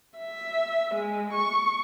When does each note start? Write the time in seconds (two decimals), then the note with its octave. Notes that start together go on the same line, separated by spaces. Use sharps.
0.18 E5
0.95 G#3
1.33 C#6